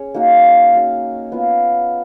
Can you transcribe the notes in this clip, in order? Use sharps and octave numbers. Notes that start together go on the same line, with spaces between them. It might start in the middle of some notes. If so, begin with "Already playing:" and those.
Already playing: C#4 G#4 C#5
A#3 D#4 F#4 A#4
C#4 F#4 A#4 F5
B3 F4 B4